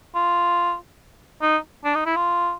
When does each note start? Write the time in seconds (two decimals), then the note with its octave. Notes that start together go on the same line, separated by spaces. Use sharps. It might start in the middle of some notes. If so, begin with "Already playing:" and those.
0.15 F4
1.42 D#4
1.84 D4
1.95 D#4
2.06 E4
2.16 F4